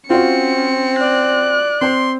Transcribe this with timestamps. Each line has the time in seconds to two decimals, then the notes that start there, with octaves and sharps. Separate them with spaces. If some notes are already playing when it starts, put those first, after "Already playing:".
0.10 C4 C#4 F4 F#4 C#7
1.00 D5 F#6
1.81 C4 C5 C6